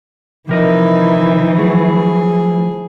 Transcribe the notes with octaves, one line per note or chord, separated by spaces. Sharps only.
C3 E3 F3 D#4 A#4 D#5 E5
F#3 A3 G#4